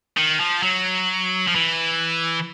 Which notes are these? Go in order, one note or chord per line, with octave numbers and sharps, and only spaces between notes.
D#3
F3
F#3
F3
E3